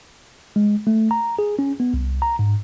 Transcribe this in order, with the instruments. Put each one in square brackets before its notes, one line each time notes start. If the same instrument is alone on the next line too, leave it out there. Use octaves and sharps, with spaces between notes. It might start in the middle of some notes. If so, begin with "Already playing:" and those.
[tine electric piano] G#3
A3
A#5
G#4
C#4
B3
C2
A#5
G#2